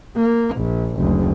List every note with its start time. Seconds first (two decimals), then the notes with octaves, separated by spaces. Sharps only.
0.16 A#3
0.56 A#1
0.97 F#1 D2